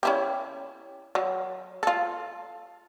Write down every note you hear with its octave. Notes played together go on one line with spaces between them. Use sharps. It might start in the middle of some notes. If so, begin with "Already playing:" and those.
C#4 E4 G4
F#3
F4 A4